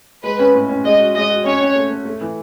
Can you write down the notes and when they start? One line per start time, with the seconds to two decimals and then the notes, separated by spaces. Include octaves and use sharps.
0.23 G#3 B4
0.39 C#4
0.54 A2
0.69 C#4
0.84 G#3 D#5
0.99 F#4
1.15 G#3 D#5
1.30 F#4
1.45 C#4 C#5
1.61 C#4
1.75 A3
1.90 A3
2.05 A3
2.21 E3